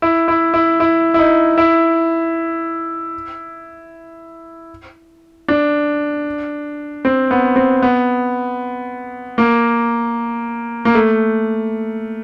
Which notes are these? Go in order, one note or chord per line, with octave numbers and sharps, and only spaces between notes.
E4
E4
E4
E4
E4
D#4
E4
D4
C4
B3
C4
B3
A#3
A#3
A3